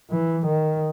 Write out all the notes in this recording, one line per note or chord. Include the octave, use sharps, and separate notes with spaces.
E3
D#3